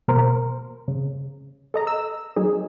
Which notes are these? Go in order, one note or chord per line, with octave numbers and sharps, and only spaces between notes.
B2 A#4 C5
C#3
A4 D#5 A#5
E6
F#3 D#4 G#4